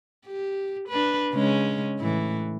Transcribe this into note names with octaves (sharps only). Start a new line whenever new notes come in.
G4
D4 B4
C#3 G#3 C#4
A2 E3